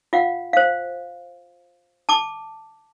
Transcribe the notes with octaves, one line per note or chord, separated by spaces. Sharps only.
F4 F5 F#5
C5 F5
A5 D6